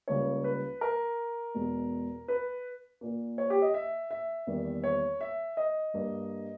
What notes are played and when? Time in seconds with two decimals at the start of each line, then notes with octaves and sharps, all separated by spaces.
0.08 C#2 C#3 G3 A#3 C#5
0.44 B4
0.81 A#4
1.55 E2 B2 G#3
2.28 B4
3.01 A#2 A#3
3.38 C#5
3.50 G4
3.62 D#5
3.74 E5
4.11 E5
4.47 E2 D#3 G3 A#3
4.84 C#5
5.21 E5
5.57 D#5
5.94 G2 G3 A#3